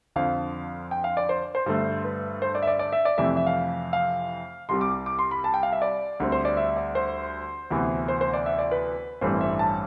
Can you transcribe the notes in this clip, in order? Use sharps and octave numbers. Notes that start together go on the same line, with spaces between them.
F2 D3 F3 F5
G5
F5
D5
C5
C5
G2 D3 A3
B4
C5
D5
E5
D5
D5
E5
D5
F2 C3 E3 A3 E5
E5
F5
F5
C2 C3 G3 C6
D6
D6
C6
B5
A5
G5
F5
E5
D5
D2 D3 G3 C4
C5
D5
E5
D5
C5
D2 C3 E3 B3
C5
C5
D5
E5
D5
B4
A1 G2 E3 A3 C4 C5
E5
A5